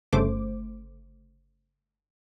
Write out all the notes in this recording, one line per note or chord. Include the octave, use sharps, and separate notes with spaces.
G1 C#3 A3 C5 D6